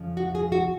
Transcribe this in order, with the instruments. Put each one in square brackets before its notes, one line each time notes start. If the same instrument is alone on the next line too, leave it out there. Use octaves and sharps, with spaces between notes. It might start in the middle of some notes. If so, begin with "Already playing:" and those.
Already playing: [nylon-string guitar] F2 C#3 F3
F#4
G#4
F#4